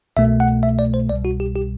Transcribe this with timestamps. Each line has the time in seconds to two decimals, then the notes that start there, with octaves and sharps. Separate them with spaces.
0.17 C2 B2 A3 E5
0.40 F#5
0.63 E5
0.79 D5
0.94 C5
1.09 C2 B2 G3 D5
1.25 F#4
1.40 G4
1.56 G4